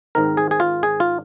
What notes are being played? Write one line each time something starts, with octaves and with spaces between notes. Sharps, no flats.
G#2 D#3 C4 D#4 A#4
G#4
G#4
F4
G#4
F4